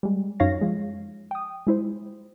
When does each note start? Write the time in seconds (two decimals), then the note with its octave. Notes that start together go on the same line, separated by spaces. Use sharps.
0.03 G3 G#3
0.40 F#2 D#4 C#5 F5 A#6
0.61 F3 G#3
1.31 G5 D#6
1.67 G#3 E4 C5